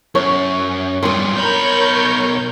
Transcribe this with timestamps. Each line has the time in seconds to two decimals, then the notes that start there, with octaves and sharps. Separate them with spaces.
0.15 F#2 C#5
1.03 G2 A#2 C6 D#6
1.36 B1 A#4 C#5 B5 G6